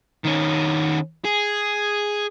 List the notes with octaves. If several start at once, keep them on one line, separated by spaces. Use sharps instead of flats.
D#3 C#4
G#4